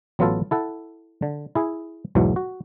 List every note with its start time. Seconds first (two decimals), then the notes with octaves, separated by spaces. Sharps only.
0.19 A1 F#3 B3 F4 A4
0.51 E4 A4 F#5
1.22 D3
1.55 E4 G#4
2.15 B1 E2 G#2 E3 F#3
2.36 F#4